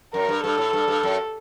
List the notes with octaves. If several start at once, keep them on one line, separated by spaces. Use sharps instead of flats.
F#2 A#4
G2
G2 A4
A2
G2
G2
F#2